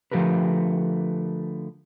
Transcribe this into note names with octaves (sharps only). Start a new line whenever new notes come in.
D3 F3 A3 G4 A#4 B4